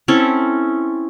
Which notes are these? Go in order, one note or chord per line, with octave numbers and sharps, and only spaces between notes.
C4 C#4 E4 A4